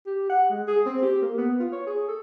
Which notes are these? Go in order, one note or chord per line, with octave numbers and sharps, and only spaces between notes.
G4
F#5
G#3
G#4
C4
G4
A#3
B3
F4
C#5
G#4
A4